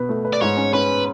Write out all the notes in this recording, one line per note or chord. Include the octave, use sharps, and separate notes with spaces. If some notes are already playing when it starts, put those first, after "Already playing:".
Already playing: B2 B4
A3
B4
D5
G#2 C#5
C#4
C#4 B4